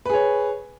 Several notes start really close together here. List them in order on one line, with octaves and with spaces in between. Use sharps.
B4 G#4 C#5